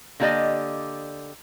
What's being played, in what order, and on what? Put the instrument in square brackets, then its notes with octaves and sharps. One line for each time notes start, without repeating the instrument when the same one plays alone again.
[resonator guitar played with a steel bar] D3 A#3 G4 D5 D#5